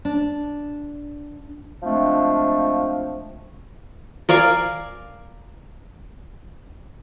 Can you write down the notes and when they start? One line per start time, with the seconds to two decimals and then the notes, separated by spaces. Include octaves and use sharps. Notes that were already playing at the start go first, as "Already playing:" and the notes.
0.05 D4
1.83 F3 G#3 A3 C4 D4
4.29 A#4 D5 F5 G#5